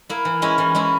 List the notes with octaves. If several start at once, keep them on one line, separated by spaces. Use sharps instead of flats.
A#3 E4
E3
G#3 C#4 E4
E3
G#3 C#4 E4